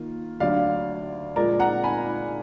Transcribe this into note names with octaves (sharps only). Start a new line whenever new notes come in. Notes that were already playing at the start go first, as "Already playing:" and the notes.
Already playing: D#3 A#3 F4
D2 D3 F#3 D5 F5
A#2 F3 G#3 A#4 D5
F#5 A#5
G#5 B5